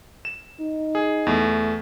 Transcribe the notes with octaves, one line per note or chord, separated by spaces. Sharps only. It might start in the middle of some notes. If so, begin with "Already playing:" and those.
E7
D#4
G#4
E2 A3